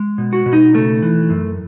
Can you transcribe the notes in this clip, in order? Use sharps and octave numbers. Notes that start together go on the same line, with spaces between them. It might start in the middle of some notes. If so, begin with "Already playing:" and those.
Already playing: G#3
B2
F#4
B2
D#4
C#3 A3
E3
F#2